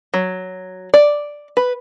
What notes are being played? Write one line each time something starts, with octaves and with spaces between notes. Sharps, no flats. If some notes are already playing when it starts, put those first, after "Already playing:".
F#3
D5
B4